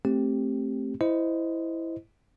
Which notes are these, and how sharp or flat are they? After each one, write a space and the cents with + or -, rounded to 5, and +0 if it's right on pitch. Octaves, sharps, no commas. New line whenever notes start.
A3 +0 C4 +10 G4 +0
E4 +0 C5 -20 D#5 +0